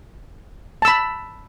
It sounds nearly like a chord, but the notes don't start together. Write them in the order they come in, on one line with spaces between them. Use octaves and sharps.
A5 E6 B5